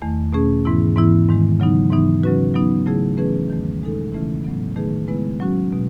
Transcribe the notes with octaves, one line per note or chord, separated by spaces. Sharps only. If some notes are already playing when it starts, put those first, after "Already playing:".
E2 D#3 A3
B2 A3 C#4 G#4
G#2 E3 B3 E4
G#2 E3 B3 E4
G#2 D#3 G#3
C#3 F#3 B3 D#4
G#2 E3 B3 D#4
C#3 F#3 C#4 F#4 B4
F#3 B3 D#4
C#3 F#3 A3 E4 G#4
E3 A3 C#4 G#4 B4
E2 D#3 F#3 A3
B2 G#3 D#4 A4
C#3 E3 A3 C#4 E4
A2 F#3 B3
D#3 A3 D#4 G#4 B4
C#3 G#3 B3 E4 B4
F#3 C#4 F#4
B2 G#3